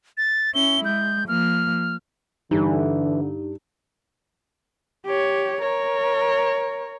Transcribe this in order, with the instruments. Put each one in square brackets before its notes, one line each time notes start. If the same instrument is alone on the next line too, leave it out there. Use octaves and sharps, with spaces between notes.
[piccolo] A6
[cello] C#4 E4 [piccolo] G7
[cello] G#3 [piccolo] G6
[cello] F3 A#3 [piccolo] F6
[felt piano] G2 [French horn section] D3 [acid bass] E3 [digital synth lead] D#4
[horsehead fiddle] G4 C#5
[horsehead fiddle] A#4 [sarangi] C#5